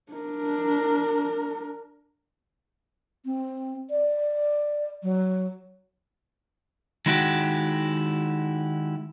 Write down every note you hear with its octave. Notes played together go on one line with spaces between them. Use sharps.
D4 A#4
C4
D5
F#3
D#3 G#3 E4 F#4 G4